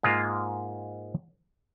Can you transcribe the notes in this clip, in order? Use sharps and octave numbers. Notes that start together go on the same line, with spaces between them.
G#2 G#3 A#3 F4